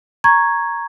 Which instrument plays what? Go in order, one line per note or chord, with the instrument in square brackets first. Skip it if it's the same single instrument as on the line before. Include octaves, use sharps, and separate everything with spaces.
[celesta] A#5 C#6 G#6